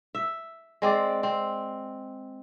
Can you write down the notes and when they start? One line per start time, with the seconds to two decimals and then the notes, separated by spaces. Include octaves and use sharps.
0.15 E5
0.82 G#3 C4 D5
1.23 C4